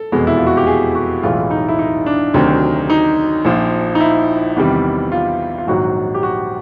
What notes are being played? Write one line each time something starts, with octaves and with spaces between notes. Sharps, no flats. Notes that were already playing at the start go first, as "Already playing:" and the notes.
Already playing: A4
F1 E2 B2 G#3
E4
F4
F#4
G4
G#4
F#4
B1 A2 E3 G#3 F4
D#4
E4
D#4
D4
D2 C3 D#3 F#3
D#4
A#1 A#2 F3
D#4
E4
E2 C3 D#3 G3
F4
F4
A#1 G#2 D#3 F#3 F#4
G4
F#4